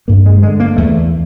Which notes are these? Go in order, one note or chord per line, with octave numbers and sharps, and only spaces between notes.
G2 A#3
G#3
D3 G#3
A#3
E2 A3